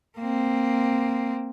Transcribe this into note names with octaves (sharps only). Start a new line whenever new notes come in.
A#3 C4